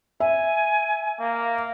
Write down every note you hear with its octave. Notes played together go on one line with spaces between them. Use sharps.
E5 G#5
A#3